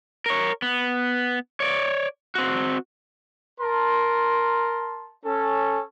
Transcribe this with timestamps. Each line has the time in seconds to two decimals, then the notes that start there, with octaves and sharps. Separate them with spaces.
0.26 A#4 C#5
0.62 B3
1.60 C#5 D5
2.35 C4 F#4
3.61 A#4 A5 C6
5.25 C#4 A4